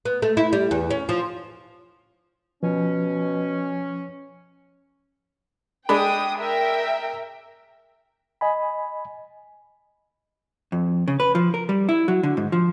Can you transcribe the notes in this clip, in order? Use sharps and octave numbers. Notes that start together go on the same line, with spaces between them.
B3
A3
E4
G3
E2
C#4
F3
B2 F3 C#4
G#3 D4 G5 B5 D#6
A#4 E5 G5
D#5 G#5 B5
F2
C#3
B4
F3
A#4
G3
E4
F#3
D3
G#2
F3